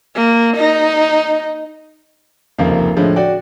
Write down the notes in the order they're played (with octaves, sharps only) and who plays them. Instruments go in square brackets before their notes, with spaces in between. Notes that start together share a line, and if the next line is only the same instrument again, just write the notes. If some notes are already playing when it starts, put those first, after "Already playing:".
[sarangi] A#3
D#4
[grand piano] F1 C#2 F3 A#3
A2 D3 F3 G#3
F#4 D5 G5